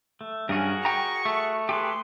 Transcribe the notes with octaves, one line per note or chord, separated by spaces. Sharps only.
A3
G2 C#4 F#4 G#4 A#4
G5 A#5 C#6
A3
G4 G#4 B4 C6